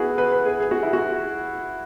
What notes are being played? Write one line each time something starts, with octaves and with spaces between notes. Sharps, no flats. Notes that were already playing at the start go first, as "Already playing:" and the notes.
Already playing: B3 E4 F#4 G#4
B4
B4
G#4
G#4
F#4
E4
F#4